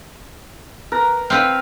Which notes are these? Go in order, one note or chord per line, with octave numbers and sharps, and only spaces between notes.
A#4 B4 A#5
C4 E4 B4 F5